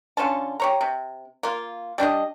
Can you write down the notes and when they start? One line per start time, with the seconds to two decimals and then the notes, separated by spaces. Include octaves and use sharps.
0.17 D3 C#4 F4 A5
0.60 G4 C#5 A#5
0.81 C3
1.43 A#3 F4
1.98 G3 D4 F#4 D#5